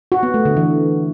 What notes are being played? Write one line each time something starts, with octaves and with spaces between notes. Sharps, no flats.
F#4
B3
A3
D3
E3